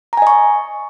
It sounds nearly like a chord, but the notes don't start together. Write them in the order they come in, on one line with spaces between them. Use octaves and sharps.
A#5 G#5 D#5 C#6